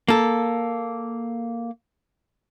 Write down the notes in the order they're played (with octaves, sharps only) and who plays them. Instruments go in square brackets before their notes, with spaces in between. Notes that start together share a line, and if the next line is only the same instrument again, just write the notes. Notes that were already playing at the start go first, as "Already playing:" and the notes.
[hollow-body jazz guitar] A#3 A4